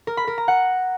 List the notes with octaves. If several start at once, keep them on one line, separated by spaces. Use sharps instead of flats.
A#4
B5
A#4
A#5
F#5